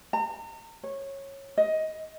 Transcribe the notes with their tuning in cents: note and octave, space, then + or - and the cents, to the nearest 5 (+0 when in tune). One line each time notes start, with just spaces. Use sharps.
A#5 -40
C#5 -15
D#5 +15